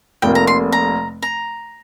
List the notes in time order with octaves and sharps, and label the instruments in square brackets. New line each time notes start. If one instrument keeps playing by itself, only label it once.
[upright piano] F1 F2 C3 A#3 [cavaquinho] G5
[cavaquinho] A#5
C6
A#5
A#5